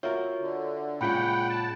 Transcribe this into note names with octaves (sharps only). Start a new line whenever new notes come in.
F4 F#4 A#4 C#5 E5
D3
A#2 C#3 G#3 F4 F#5 G5 B5
A5